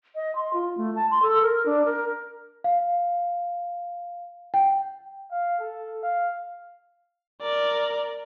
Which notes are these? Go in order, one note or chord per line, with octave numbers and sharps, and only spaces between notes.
D#5
C6
F4
A3
A5
C6
A4
A#4
D4
A#4
F5
G5
F5
A4
F5
A#4 D5